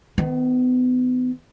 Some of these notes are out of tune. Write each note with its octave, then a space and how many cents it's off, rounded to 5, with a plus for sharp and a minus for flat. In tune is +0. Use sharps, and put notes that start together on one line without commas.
D#3 +0 B3 +35